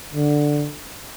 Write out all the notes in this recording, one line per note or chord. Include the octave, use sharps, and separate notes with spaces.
D3